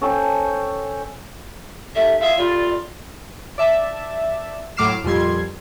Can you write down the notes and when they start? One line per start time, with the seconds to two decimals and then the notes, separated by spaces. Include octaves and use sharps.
0.01 C#4 A4 C5 G5
1.95 D#3 G3 A3 E5
2.21 F4 G#4 E5 F5
2.37 G3 A3 F4 D5
3.58 D5 E5 A5
4.77 A2 F#3 D6 F6 C7 E7
5.04 F2 A#2 G3 C6 G#6